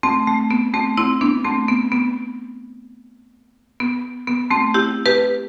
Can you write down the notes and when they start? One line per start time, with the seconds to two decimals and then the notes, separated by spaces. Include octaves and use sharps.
0.03 A3 C4
0.27 A3
0.51 B3
0.74 A3 C4
0.97 C4 E4
1.21 B3 D4
1.45 A3 C4
1.68 B3
1.92 B3
3.80 B3
4.28 B3
4.51 A3 C4
4.74 E4 G4
5.06 G4 B4